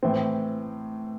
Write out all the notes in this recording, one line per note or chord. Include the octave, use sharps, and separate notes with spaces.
A2 E3 C4